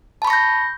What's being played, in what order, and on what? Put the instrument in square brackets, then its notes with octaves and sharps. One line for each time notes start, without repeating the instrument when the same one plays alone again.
[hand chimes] A5
B5
C#6
A#6
G6